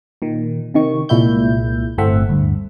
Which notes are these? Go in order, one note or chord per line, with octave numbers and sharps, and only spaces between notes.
A#2 D#3
C3 D#3 C#6
C2 A#2 G#3 E4 E5 G6
G1 A2 A3 C4 E5 F#5
D2 G2